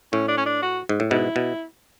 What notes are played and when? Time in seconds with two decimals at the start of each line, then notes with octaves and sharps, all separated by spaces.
0.13 A2 C#4
0.28 D4
0.37 C#4
0.46 D4
0.62 F#4
0.89 G#2
1.00 A2
1.11 G#2 B2 E4
1.36 B2